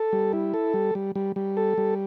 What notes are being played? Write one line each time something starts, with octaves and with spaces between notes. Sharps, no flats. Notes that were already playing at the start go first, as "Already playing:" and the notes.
Already playing: A4
G3
E4
A4
G3
G3
G3
G3
A4
G3